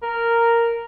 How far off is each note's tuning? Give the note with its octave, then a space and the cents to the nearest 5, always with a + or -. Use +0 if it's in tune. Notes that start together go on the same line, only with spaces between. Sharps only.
A#4 -5